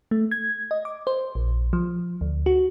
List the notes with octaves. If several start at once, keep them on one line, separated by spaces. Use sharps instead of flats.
A3
G#6
D#5
D6
C5
A#1
F3
D2
F#4